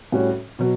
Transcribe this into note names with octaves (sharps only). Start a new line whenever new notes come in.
A2 G3 C#4 F#4 C#5
B2 F#3